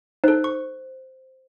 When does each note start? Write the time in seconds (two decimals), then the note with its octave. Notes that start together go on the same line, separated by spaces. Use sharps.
0.24 D#4 A4 C5
0.44 C#6